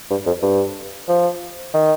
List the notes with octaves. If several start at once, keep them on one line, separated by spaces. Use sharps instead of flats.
G2
F2
G2
F3
D#3